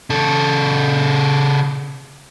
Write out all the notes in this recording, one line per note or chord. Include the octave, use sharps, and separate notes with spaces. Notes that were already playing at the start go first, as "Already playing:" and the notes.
C#3 A4